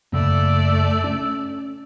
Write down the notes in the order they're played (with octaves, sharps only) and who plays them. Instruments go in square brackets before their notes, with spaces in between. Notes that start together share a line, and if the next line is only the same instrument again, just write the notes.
[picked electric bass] F#2 C#3 A#3 [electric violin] A3 D5 [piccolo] E6
[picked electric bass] C#4